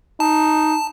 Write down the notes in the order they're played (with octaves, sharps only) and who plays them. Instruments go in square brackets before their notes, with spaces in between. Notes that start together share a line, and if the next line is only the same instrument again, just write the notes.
[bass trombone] D#4 [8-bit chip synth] A5